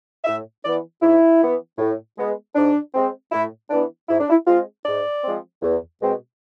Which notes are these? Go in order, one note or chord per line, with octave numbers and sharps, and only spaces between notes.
A2 E5
E3 B3 D5
G#2 E4
E3 B3
A2
G#3 B3
G#2 D4
G#3 C4
A2 E4
E3 B3 D4
G#2 E4
D4
E4
G#3 C4 F4
G#2 D5
F3 G#3 C4
E2
B2 G#3 C4